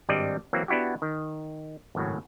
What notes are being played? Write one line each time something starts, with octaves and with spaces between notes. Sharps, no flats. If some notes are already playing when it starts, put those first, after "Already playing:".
G#1 G2 G3 C4 D5 D#5
E3 F#3 A#3 C4
B3 D4 E4 F#4 G4
D#3
G#1 F#2 A2 C#3